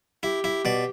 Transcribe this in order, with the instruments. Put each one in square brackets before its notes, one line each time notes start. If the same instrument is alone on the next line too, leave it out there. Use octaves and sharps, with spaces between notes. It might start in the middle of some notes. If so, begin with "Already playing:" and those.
[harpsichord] E4 [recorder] G4
[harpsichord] E4
B2 D5